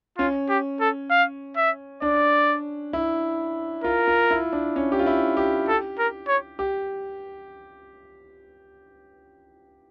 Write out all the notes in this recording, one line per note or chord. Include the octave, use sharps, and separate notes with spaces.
C#4 F4
G4
A4
F5
E5
D4 D5
E4
F4 A#4
F4
E4
D4
C#4
G4
F4
E4
G4
A4
A#4
C#5
G4